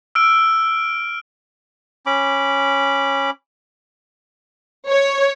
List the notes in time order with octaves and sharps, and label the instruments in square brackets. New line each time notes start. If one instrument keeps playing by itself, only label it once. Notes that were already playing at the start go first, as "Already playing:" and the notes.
[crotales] E6 F6 D7
[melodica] C#4 B5 D6
[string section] C#5